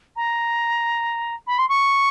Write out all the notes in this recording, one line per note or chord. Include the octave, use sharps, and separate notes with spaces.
A#5
B5
C6
C#6